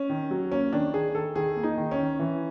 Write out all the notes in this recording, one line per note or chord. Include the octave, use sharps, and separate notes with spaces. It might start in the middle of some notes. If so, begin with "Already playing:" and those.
Already playing: C#4
D#3
F#3
A#3 C#4
D#3 D4
D#3 G#4
D#3 A4
D#3 G#4
A#3
D#4
D#3
C#4
D#3
E3